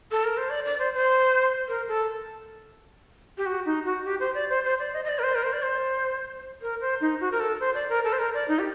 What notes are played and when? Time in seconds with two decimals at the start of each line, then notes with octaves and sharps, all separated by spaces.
0.11 A4
0.24 A#4
0.37 C5
0.50 D5
0.65 D5
0.79 C5
0.94 C5
1.68 A#4
1.88 A4
3.38 G4
3.46 F#4
3.66 D#4
3.85 F#4
4.05 G4
4.20 C5
4.34 D5
4.50 C5
4.64 C5
4.79 D5
4.93 D#5
5.05 D#5
5.09 D5
5.19 A#4
5.23 C5
5.35 A#4
5.43 C5
5.53 D5
5.63 C5
6.62 A#4
6.81 C5
7.01 D#4
7.21 F#4
7.32 A#4
7.40 A4
7.60 C5
7.75 D5
7.89 A#4
8.04 A4
8.13 C5
8.19 A#4
8.34 D5
8.48 D#4
8.59 G4